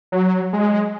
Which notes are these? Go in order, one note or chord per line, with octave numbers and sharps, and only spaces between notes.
F#3
G#3